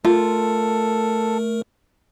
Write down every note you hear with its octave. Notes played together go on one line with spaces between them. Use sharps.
A3 F4 A4 A#4